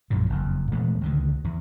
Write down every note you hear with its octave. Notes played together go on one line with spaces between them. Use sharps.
A#1 F#2 A#2 D3
F#1 F2
A#2 E3 G#3 A3
C#2 D3 D#3
E2